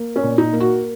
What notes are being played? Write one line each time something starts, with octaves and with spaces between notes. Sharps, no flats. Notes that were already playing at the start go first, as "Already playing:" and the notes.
Already playing: A#3
C#4
A#2
D#4
A#3
F#4